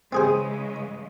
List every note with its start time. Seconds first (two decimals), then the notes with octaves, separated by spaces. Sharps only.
0.13 C#3 E3 G#3 C4 G#4 C5